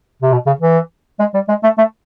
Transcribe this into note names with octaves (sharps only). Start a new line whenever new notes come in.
C3
B2
C#3
E3
G#3
G3
G#3
A3
A3